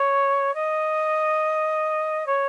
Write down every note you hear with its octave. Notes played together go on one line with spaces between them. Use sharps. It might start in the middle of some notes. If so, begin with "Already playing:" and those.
Already playing: C#5
D#5
C#5